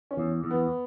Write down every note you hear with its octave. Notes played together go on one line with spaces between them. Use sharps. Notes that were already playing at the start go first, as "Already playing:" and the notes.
C#4
E2
E2
B3